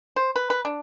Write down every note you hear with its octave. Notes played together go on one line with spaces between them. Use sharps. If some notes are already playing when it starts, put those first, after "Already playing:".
C5
B4
B4
D4